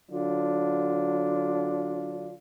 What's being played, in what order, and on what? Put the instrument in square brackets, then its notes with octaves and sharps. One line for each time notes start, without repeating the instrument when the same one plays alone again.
[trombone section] D3 F#3 D4 F4